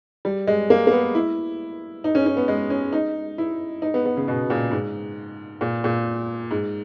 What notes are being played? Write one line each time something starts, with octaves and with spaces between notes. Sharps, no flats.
G3
G#3
A#3
A#3
B3
E4
D#4
C#4
C#4
B3
G#3
C#4
D#4
E4
D#4
B3
B3
C#3
B2
A#2
G#2
A#2
A#2
G#2